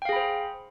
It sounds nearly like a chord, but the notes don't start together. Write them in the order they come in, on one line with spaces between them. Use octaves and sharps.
G5 F5 G#4 B5 C5